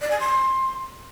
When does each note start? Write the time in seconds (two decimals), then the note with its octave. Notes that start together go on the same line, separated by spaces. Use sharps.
0.02 D5
0.11 G#5
0.20 C6